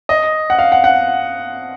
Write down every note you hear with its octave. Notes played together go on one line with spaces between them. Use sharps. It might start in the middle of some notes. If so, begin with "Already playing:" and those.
D#5
F#5
F5
F#5
F#5